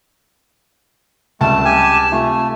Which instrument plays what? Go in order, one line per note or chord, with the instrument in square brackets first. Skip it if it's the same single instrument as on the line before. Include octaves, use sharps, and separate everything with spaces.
[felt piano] C#2 C3 G3 [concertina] A3 [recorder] A5
[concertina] G4 G#5
[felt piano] C3 F4 [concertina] A3